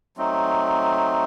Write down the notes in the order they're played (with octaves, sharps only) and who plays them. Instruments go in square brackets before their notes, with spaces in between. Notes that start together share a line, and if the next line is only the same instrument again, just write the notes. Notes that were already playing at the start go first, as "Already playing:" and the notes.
[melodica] F#3 A3 C4 D#4